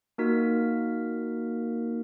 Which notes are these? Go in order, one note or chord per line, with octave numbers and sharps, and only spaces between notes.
A#3 D#4 F#4 A#4 B6